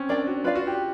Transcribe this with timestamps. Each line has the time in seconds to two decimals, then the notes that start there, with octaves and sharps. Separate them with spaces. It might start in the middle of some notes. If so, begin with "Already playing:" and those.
Already playing: C4 C#4
0.09 D4 A#4 D5 G5
0.27 F#4
0.44 F4 B4 D5 F5
0.55 F#4
0.67 G4